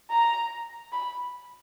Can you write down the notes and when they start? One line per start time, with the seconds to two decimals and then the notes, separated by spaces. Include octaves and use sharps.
0.10 A#5
0.92 B5